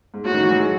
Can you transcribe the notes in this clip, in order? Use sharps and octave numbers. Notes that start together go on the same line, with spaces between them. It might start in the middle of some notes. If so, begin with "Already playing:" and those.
G#2
A2 F#4
D#3
E3
F#3
G#3